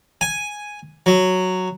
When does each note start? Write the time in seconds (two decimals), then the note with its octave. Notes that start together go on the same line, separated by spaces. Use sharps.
0.21 G#5
1.06 F#3